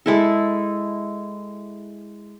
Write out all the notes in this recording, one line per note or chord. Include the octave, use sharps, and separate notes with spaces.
G#3 E4 A4